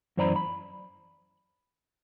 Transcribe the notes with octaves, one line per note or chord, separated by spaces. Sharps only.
F#2 E3 C5 D5 A#5 B5
B5